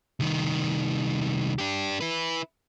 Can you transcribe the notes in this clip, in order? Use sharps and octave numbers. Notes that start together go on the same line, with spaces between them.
C2 D#3
D4 G4
E4 B4